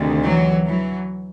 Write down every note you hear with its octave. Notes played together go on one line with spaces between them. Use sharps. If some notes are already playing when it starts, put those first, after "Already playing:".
Already playing: D2 C3 D#3
E3 F#3
E3 F#3